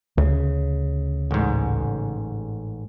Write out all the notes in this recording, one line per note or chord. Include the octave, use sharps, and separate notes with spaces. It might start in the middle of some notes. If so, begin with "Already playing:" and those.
D2 C#3
A1 G#2